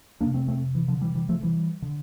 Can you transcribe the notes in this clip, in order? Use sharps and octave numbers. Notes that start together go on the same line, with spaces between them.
F2 C3 A#3 D4
A3 C4
A3 C4
E3
D3 F3
E3 G3
E3 G3
F3 A3
E3 G3
D3